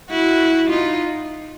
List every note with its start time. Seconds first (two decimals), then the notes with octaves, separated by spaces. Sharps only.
0.10 E4 F#4
0.70 D#4 F4